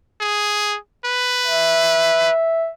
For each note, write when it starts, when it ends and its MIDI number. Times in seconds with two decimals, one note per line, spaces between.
0.21 0.77 68
1.05 2.31 71
1.45 2.73 76